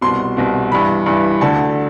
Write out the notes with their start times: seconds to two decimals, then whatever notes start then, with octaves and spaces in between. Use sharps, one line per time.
0.01 C2 B2 C6
0.37 C2 B2
0.72 G2 E3 B5
1.06 G2 E3
1.41 D2 D3 A5